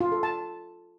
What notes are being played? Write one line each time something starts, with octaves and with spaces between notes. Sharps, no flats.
F4
A4
A5